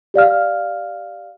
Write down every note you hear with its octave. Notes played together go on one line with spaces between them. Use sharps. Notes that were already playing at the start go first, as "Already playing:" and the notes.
G4 D5 F5 F6